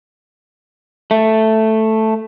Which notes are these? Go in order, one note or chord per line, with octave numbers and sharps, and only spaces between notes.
A3